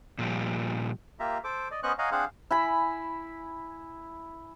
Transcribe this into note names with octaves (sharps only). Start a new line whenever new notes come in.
A#2 F3 G3
A#3 F4 G4 E5 A#5
A4 C5 D6
D5 D#5
B3 C#4 C5 D#5 C#6 F#6
C#5 D#5 F5 F#5 G#5 A#5
C4 D4 G#4 C5 F5 F#5
E4 G#5 B5